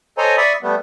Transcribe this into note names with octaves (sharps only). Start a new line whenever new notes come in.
A4 C5 C#5 D#5 G#5 A#5
D5 E5 B5 C#6 D#6
G3 A3 B3